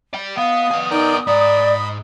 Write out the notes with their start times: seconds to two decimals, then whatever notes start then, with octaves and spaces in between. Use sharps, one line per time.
0.13 D5 G5
0.37 B3 D#5 F5 D#6
0.71 B3 G#5
0.91 D#4 A#4 D5 G5
1.27 G#2 D5 D#5 A#5 B5